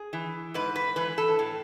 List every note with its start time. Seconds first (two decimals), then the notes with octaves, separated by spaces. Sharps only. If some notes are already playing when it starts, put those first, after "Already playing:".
Already playing: G#4
0.13 E3
0.54 G#2 B4
0.76 B4
0.96 E3 B4
1.18 A4
1.39 A2